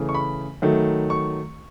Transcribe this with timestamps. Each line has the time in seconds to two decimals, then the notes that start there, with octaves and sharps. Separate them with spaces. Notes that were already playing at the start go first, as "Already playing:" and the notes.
Already playing: C#3 E3 A3
0.09 C#6
0.15 B5
0.62 D#3 F#3 A3
1.10 C#6